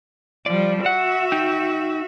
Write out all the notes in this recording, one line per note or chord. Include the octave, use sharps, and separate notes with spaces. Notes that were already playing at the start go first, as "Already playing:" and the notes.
F3 G3 D5
F#4 E5 F#5
D#4 G5